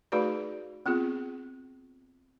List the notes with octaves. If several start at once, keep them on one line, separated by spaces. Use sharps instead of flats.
A3 D#4 F#4 G#4 B4 D5
B3 C4 F4 G#4